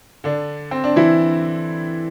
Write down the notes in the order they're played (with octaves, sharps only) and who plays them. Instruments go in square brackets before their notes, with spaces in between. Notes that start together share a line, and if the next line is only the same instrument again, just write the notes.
[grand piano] D3 D4
C4
D4
E3 E4